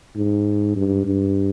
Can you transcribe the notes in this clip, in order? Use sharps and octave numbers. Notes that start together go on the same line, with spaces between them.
G#2
G2
G2